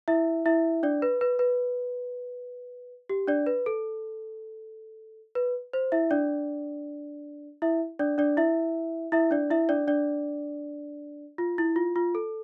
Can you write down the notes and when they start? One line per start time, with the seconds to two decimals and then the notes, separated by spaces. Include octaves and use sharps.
0.08 E4 E5
0.46 E4 E5
0.83 D4 D5
1.02 B4
1.21 B4
1.39 B4
3.09 G4
3.27 D4 D5
3.46 B4
3.66 A4
5.35 B4
5.73 C5
5.92 E4 E5
6.11 D4 D5
7.62 E4 E5
7.99 D4 D5
8.18 D4 D5
8.37 E4 E5
9.12 E4 E5
9.31 D4 D5
9.50 E4 E5
9.69 D4 D5
9.87 D4 D5
11.38 F4
11.58 E4
11.76 F4
11.96 F4
12.15 A4